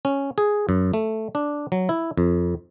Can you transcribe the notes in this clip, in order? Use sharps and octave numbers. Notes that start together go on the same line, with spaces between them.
C#4
G#4
F#2
A3
D4
F#3
E4
F2